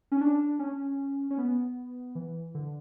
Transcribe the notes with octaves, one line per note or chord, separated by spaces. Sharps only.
C#4
D4
C#4
C#4
B3
E3
D3